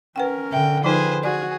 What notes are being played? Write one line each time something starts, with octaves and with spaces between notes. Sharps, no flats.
C#4 A#4 B4 F#5 G5
D3 E5 G5
F3 D#4 F4 G#4 B4 C5
F#4 G#4 D5